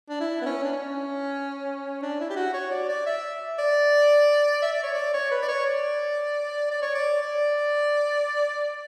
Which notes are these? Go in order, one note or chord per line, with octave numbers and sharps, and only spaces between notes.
D4
E4
B3
C#4
D4
C#4
D4
E4
G4
F#4
C#5
D5
D5
E5
D5
E5
D5
C#5
D5
C#5
B4
D5
C#5
D5
D5
C#5
D5
D5